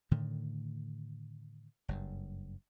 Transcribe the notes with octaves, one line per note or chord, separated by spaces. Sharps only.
A2 D3 D#3 A3
F#1 G2